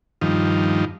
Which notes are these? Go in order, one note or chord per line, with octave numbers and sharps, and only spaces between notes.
G2 D#3 F3